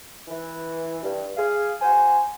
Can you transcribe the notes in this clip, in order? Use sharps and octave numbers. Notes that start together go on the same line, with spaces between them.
E3
G2
G#4 F5
F#4 C5 G#5